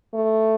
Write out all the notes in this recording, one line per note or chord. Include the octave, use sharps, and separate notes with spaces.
A3